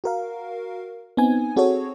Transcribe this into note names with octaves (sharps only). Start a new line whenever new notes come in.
F#4 A#4 F5
B3 C4 D#4 G#5
C4 F#4 G#4 A4 C#5